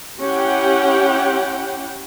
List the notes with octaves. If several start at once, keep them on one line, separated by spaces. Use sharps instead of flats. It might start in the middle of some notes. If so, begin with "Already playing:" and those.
C#4 E4 G4 F#5 G5